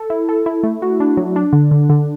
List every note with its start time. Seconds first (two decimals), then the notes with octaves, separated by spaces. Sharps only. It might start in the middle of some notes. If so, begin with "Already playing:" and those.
Already playing: A4
0.10 E4
0.29 A4
0.46 E4
0.63 A3
0.82 F#4
1.00 D4
1.17 F#3
1.36 D4
1.53 D3
1.71 D3
1.89 D3